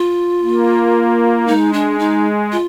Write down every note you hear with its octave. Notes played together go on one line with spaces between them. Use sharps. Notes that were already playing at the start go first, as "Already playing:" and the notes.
Already playing: F4
A#3
G#3 D#4
D4
D#4
F4